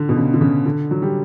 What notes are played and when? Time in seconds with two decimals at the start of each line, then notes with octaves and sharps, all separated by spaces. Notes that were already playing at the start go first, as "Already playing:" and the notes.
Already playing: D3
0.09 B2
0.17 C#3
0.34 D3
0.41 C#3
0.66 D3
0.91 F#3
1.02 G3